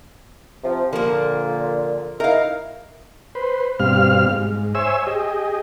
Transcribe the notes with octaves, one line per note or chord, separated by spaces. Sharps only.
C3 F3
A#2 D3 F3 A#3
D#4 E4 A#4 F5
B4 C5
G2 B2 G3 C4 F5 F6
G#2
C5 C#5 E5 G#5 E6
G4 G#4 D#5